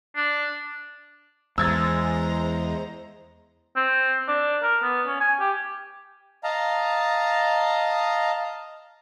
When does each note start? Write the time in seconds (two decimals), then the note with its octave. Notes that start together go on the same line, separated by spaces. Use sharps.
0.16 D4
1.58 E2 G#3 C5 A#5 E6 G#6 A6
3.77 C4
4.28 D4
4.63 A#4
4.83 B3
5.07 C#4
5.21 G#5
5.40 G4
6.44 D#5 F5 A5 A#5